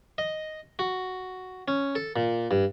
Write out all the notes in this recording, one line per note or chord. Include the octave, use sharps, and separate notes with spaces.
D#5
F#4
C#4
A4
A#2
G2